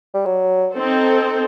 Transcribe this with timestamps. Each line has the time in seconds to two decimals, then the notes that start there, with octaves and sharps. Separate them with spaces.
0.14 G3
0.26 F#3
0.73 C4 D#4 A4 C5